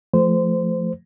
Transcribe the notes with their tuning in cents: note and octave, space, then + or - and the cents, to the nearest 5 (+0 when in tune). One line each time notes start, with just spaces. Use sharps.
F3 -5 A3 -5 C5 -20